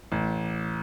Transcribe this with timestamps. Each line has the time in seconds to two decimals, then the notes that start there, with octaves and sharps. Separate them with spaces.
0.12 A1